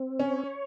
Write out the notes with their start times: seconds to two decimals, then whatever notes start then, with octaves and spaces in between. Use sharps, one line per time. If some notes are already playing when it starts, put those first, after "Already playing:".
Already playing: C4
0.19 C#4 C#5